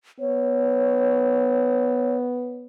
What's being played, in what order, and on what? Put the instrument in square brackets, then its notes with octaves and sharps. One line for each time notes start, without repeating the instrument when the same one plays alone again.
[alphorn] B3 [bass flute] C#5